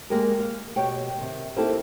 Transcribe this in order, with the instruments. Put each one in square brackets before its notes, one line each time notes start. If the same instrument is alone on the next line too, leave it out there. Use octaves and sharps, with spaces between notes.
[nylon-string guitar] G#3 A#3 G4 G#4 A#4
F5
B2 G4 C#5 G5
C3 D#3
A#3 C4 D#4 E4 G4 A4